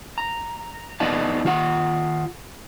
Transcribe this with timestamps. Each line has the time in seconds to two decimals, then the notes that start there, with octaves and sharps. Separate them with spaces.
0.18 A#5
1.00 E2 B3 D#4 D5 F5 A5
1.45 D#3 F4 F#5